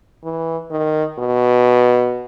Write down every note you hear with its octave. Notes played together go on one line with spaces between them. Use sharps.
E3
D#3
B2